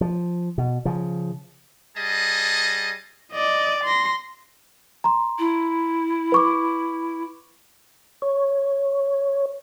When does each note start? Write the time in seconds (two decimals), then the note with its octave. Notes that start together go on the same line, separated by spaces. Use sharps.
0.01 F3
0.58 B2
0.85 C#3 F3
1.97 G3 G#4 D#5 A5
3.32 D5 D#5
3.84 C6 A#6
5.04 A#5 C6
5.39 E4
6.32 B4 C#6 D6
8.22 C#5